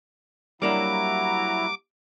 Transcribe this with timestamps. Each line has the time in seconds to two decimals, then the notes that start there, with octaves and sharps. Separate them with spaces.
0.62 F#3 G3 A#3 D4 E4 F#5 A#5 D6